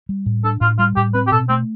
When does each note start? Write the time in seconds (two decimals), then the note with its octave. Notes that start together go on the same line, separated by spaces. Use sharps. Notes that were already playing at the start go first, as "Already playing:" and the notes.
0.09 G3
0.26 A2
0.44 D4 A4
0.61 A2 F4
0.78 G3 F4
0.96 A2 G4
1.14 C4 B4
1.27 G4
1.32 B2 A4
1.49 A3 C4